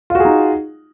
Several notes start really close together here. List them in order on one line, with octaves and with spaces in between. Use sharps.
F4 F#4 G#4 D#4